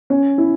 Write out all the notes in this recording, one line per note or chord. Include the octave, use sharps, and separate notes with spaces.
C#4
E4